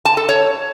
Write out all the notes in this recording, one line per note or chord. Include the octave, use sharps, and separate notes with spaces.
A5
A4
C#5